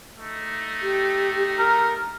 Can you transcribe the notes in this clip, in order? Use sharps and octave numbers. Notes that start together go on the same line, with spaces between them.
A3 D#4
G4
A#4